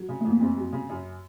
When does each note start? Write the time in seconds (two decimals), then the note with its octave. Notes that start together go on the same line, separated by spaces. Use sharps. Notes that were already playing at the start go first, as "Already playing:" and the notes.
Already playing: F#3
0.09 C#3
0.21 F2 A3
0.31 A#3
0.40 F#1 C4
0.57 F#3
0.72 C#3
0.89 F#2